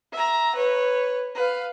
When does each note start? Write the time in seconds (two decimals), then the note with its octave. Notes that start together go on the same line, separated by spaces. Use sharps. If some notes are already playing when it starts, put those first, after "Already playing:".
0.13 E5 A#5
0.55 B4 C#5
1.35 B4 F5